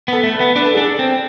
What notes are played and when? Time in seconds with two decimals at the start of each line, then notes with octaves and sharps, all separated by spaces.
0.08 B3 A4
0.23 A3
0.34 B4
0.40 B3
0.56 D4 B4
0.65 A4
0.75 D4 G#4
0.83 A4
0.99 C4